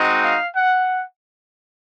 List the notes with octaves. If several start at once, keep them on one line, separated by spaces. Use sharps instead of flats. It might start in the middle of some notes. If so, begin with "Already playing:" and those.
Already playing: G#3 C4 D#4 F#4
F5
F#5